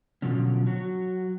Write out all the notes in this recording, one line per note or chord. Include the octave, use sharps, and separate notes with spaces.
B2 D3 F3 F#3 C#4
F#3 F#4